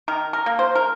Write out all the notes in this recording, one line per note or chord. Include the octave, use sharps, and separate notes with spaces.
D#3 A#4
A#4
A#3
C5
A#4